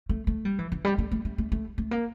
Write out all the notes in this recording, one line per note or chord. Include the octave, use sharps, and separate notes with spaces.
A3
A3
G3
E3
E3
G3
A3
A3
A3
A3
A3
A3
A#3